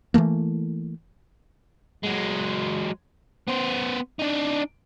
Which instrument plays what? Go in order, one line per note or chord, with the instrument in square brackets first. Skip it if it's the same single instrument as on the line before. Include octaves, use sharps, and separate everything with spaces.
[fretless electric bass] E3 F3 A3 A#3
[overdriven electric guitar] F#3 G#3
B3 C5
D4 D#4